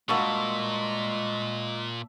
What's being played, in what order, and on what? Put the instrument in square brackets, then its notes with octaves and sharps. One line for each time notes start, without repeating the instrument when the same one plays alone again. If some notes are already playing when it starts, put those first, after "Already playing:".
[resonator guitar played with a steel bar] G2 A#3 F#4 [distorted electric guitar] A#2 [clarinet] G#3 [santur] E5 A5 C#6